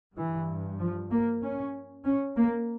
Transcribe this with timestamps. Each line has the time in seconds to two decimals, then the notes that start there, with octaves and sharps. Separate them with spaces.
0.17 G2 E3
0.80 F3
1.11 A#3
1.42 C#4
2.05 C#4
2.37 A#3